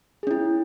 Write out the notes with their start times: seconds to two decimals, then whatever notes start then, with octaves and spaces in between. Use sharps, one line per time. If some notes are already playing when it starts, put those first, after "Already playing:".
0.23 G#4
0.27 C#4
0.31 E4